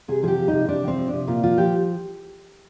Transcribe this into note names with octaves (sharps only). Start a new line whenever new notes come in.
C3 G#4
F3 G4 G#4
F3
C3 D#4
C3 D4
F3
C4
F3
D4
C3
A#2 F4
F3 F4
F3 G4